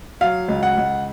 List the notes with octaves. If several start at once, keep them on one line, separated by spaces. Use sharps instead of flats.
F#3 F5
C#2
F#5
C#2